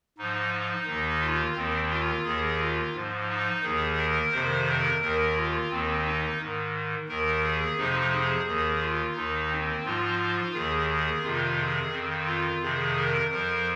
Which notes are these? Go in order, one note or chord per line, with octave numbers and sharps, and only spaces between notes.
G#2 F3 D#4
D#2 D#3
F4
D#2 D#3 C4
F4
D#2 D#3 G#4
F4
G#2 F3
D#4
D#2 D#3 G#4
A#4
F2 C3 D#3 C5
A#4
D#2 D#3 A#4
F4
D#2 D#3 C4
D#4
G#2 D#3
D#2 D#3 A#4
G#4
F2 C3 F3 D#4
G#4
D#2 D#3 G#4
F4
D#2 D#3 D#4
C4
G#2 F3 F4
D#2 D#3 G#4
G#4
F2 C3 D#3 F4
G#4
F2 D#3 C4
F4
F2 C3 D#3 G#4
A#4
F2 F3 A#4